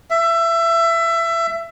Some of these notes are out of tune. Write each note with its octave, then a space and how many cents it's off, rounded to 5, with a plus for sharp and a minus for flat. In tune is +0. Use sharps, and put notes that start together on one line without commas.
E5 +20